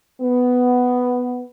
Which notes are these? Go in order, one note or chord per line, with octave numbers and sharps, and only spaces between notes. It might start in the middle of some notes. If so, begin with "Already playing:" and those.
B3